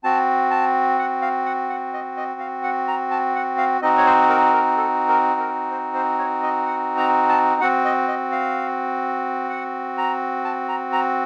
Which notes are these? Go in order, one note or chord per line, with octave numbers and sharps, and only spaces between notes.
C4 F#4 A5
A5
F#5
F5
F#5
F#5
D#5
D#5
F5
F#5
A#5
A5
F#5
F5
C4 D#4 F#4 D#5
C#5
C5
A#4
A#4
A4
A#4
A#4
C5
C5
C#5
D#5
F#5
A#5
A5
C4 F#4 F#5
D#5
D#5
F5
F#5
A#5
A5
A#5
A#5